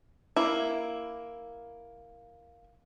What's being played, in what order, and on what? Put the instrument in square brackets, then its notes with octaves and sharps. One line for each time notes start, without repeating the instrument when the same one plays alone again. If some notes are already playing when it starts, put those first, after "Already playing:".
[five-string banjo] A#3 E4